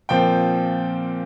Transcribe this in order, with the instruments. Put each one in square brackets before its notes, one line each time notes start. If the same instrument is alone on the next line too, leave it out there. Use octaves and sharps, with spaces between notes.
[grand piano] A#2 F3 C4 G5